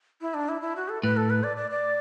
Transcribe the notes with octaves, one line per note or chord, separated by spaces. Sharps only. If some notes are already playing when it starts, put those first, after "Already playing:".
E4
D4
E4
E4
F#4
A4
A2 B4
A4
B4
D5
D5
D5